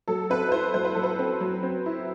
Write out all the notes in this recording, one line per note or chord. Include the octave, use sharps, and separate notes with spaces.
F#3 A4
C4 B4
B4
E4 C5
F#3 C5
B4
F#3 A4
B4
C4
F#3
C4
E4